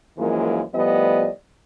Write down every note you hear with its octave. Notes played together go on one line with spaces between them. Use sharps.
F#2 E3 F3 G#3 A#3
A2 F3 G3 B3 D5 D#5